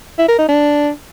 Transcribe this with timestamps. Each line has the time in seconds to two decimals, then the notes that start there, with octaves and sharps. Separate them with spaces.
0.18 E4
0.28 A#4
0.38 D#4
0.48 D4